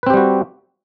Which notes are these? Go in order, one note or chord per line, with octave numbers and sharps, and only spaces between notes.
G3 C4 F#4 G4 B4